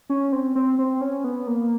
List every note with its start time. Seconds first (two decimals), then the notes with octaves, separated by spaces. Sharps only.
0.10 C#4
0.33 C4
0.55 C4
0.79 C4
1.01 C#4
1.24 B3
1.47 A#3